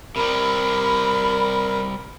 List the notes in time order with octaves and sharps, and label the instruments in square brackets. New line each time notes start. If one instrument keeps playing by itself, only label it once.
[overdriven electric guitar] C3 G3 [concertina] A#4 [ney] B5